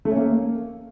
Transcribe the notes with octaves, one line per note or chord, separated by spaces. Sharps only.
A3
C#4
A#3